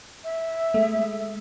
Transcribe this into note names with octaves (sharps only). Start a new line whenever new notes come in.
E5
G#3 A3